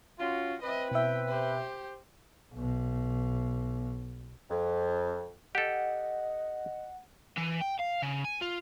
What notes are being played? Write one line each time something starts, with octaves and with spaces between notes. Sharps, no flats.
C#4 F4 F#4
C4 B4 D#5 E5
B2 E4 E5 G5
G4 C5
B1 B2
F2
G4 A4 D#5 F#5
E3
G5
F5
C#3
G#5
F4